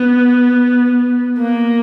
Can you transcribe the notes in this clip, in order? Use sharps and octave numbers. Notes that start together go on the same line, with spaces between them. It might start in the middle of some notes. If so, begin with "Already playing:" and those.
Already playing: B3
A#3